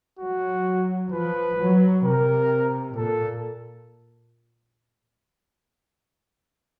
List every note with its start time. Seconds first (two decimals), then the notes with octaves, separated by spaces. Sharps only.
0.19 F#3 F#4
1.11 F3 B4
1.59 F#3
2.04 C3 A#4
2.96 A#2 A4